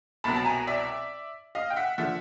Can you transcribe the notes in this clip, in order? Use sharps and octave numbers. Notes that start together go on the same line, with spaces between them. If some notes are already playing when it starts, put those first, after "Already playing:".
C2 B2 F#3 A5 B5
A5
G#5 A#5
D5 E5
D#5 F5
G5
E5 F#5
D3 F3 E5 F#5